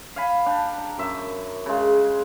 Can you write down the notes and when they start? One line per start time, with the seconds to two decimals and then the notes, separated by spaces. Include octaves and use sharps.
0.16 F5 G#5 B5
0.46 D4 G5
0.78 A#5
0.98 F#2 E5
1.66 C#3 G#3